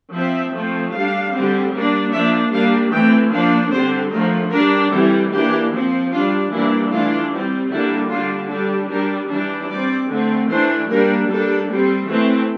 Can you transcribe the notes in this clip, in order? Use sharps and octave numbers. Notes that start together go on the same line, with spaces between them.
F3 C4 E5
F3 A3 C4
G3 D4 F5
D3 G3 C4
G3 A#3 D4
F3 A#3 D4 E5
G3 A#3 D4 F5
E3 A3 C4 G5
F3 A#3 D4 F5
D3 G3 C4 C5
D3 F3 A3 A#4
G3 D4 A#4
E3 G3 C4 A4
E3 A#3 D4 G4
F3 C4
G3 D4 F4
E3 G3 A#3 D4 E4
E3 A3 D4 F4
G3 C4
D3 G3 A#3 D4 E4
D3 G3 D4 F4
G3 D4 A4
G3 D4 A#4
E3 G3 D4
G3 C4 D5
D3 A3 C4
E3 A3 D4 C5
G3 A#3 D4 A#4
G3 A#3 D4 A4
G3 C4
E3 A3 C4